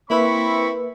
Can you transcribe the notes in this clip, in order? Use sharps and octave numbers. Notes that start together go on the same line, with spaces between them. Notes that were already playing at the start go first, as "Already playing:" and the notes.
A#3 C4 E4 B4 E5 B5 C#6